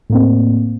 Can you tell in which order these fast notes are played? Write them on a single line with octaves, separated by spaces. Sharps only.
A2 A#3 C4